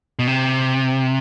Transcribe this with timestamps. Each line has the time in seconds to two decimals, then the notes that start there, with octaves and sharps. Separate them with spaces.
0.19 B2
0.27 C3